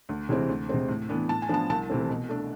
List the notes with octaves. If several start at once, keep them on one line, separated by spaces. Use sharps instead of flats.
D2
C3 E3 G#3 C4
D2
C3 G#3 C4
A2
E3 B3 D4
A2 A5
G#5
F3 B3 D4 A5
C2 A5
C3 E3 A3 C4
B2
A3 D4